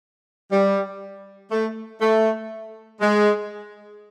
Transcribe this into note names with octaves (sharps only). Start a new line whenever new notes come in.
G3
A3
A3
G#3